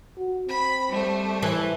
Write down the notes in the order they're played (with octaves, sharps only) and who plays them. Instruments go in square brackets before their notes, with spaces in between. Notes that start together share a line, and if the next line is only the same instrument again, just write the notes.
[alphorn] F#4
[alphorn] C4 [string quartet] B5
[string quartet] G3 A3 C5
[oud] E3